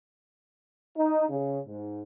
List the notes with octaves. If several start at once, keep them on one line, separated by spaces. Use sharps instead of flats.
D#4
C#3
G#2